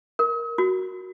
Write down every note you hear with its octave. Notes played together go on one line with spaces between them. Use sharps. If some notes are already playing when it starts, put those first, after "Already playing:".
A#4
F#4